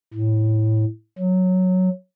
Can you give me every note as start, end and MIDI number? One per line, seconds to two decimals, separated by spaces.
0.13 0.84 45
1.18 1.88 54